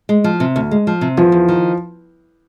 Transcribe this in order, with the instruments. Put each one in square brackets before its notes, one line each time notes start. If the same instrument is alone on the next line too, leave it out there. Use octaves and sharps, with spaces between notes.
[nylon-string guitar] G#3
F3
C3
D2
G#3
F3
C3
[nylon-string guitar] E2 [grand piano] F3
[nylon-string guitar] E2
D#3